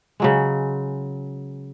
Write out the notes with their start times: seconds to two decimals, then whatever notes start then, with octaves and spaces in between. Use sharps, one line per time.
0.20 C#3 F#3 G#3